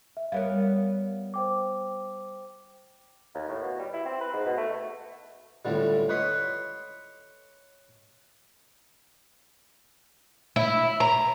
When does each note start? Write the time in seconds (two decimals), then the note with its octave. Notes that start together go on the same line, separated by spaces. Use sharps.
0.17 E5
0.32 G3 B3 A#4 C#5 F5
1.34 C5 G5 D6
3.34 D#2
3.49 A2
3.62 B2
3.79 G3
3.93 E4
4.06 C4
4.21 B4
4.34 G#2
4.46 B2
4.57 A3
5.65 C#2 A2 D3 G3
6.09 B4 C#5 D#5 B5 C6
10.56 E4
11.00 A#5